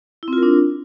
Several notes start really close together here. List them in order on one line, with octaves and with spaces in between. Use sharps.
E4 C4 F4 A#4 D4